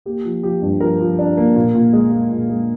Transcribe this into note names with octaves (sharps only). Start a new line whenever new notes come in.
A#3 G4
F3
F3 G4
G2
F3 A#4
F3
D4
A#3
A#2
A#2
G#3
G#3
A#2
G#3